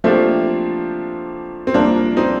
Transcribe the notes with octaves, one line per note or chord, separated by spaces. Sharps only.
F3 A3 A#3 C4 D4 G4
C4
C2 C3 F3 A#3 D4
C4 D#4